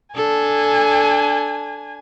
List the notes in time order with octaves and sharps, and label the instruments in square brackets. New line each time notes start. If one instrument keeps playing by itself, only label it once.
[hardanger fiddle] D4 [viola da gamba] A4 [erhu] G#5